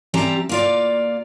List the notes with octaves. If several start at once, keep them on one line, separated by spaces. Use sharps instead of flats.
E3 G3 C4 G4 A5 A#5
A#3 F4 D5